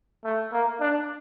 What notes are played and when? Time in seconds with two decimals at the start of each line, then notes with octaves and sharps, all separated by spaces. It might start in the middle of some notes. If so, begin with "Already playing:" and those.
0.24 A3
0.52 A#3
0.81 D4